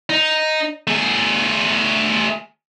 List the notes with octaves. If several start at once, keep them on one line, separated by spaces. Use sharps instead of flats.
D#4
A3 G#4